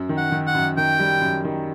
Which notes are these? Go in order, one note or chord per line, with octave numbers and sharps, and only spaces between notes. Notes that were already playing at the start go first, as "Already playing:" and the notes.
Already playing: F#2
D#3
F#5
D#3
F#5
F#2
D#3 G5
G3
F#2
D#3